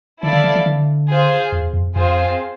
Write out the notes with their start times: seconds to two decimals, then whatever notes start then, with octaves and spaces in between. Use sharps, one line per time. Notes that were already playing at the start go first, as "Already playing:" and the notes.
0.22 D3 E4 A4 D5 F5
0.33 D3
0.44 E3
0.56 E3
0.66 D3
1.10 F4 G#4 C5 F5
1.52 E2
1.73 F2
1.96 F2 C4 F4 G#4 C5